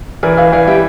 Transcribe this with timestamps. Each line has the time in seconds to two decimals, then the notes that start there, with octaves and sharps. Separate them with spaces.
0.23 E3 A#4 D5
0.37 E3 D5 F5
0.52 E3 D5 F5
0.67 G3 E5 G5